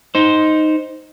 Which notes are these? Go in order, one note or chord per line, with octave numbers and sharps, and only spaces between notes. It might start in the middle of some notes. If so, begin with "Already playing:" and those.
D#4 C5